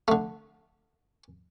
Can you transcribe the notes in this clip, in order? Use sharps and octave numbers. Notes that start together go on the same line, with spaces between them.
D3 A3